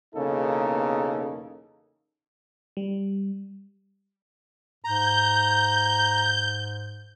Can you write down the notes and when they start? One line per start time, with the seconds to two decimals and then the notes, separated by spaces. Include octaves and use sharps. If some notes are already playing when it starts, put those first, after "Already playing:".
0.15 B1 E2 C#3 A#3 D#4 A4
2.77 G3
4.84 G#2 A#5 G6